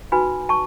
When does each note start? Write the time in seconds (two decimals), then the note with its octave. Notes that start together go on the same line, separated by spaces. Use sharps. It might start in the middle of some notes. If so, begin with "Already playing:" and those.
0.12 D#4 F#4 B4 G#5 B5
0.49 A5 C#6